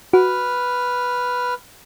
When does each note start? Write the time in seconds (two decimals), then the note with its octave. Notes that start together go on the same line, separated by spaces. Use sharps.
0.13 F#4 B4 F6